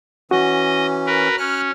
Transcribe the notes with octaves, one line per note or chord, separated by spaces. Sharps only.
E3 C#4 F#4 D#5
A#4 B4
C#4 F6 F#6